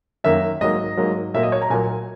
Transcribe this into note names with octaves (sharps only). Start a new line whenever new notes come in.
F#2 D#3 A#3 E5
G#2 F#3 A#3 D#5
G#2 F#3 A#3
A#2 F#3 A#3 E5
D#5
C#5
A#5
A#2 F#3 A#3 G#5